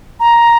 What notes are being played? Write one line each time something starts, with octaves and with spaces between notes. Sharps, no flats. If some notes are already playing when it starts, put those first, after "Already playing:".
A#5